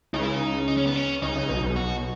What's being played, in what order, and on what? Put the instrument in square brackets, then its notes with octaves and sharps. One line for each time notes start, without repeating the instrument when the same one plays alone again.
[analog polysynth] C#2 C#3 [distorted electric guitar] D#4
[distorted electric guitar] E4
D#4
D#4
C#4
B3
C#4
[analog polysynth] C#2 C#3 [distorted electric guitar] D#4
[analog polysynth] C#2 C#3
B1 B2
B1 B2
[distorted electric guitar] F#4